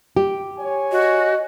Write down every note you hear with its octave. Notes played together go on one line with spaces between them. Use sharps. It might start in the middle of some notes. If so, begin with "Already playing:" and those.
G4
C#5 G#5
F#4 D#5